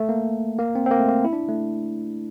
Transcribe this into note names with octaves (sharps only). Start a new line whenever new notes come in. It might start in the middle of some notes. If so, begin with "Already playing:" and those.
Already playing: A3
A#3
A#3
C4
C4
A#3
A3
A#3
E4
D4
A3